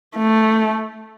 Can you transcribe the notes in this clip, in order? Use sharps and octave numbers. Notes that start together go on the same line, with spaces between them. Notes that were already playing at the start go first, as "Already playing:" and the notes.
A3